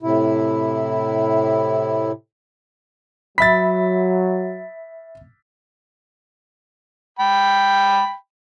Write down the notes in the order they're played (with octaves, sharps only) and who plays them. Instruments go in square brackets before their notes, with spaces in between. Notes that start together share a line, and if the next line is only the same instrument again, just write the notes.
[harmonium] A2 C3 E4
[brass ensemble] F#3 [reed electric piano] E5 B5 [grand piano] A6 B6
[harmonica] G5 B5